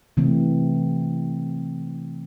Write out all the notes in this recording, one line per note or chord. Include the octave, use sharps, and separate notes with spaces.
C3 E3 A3 C4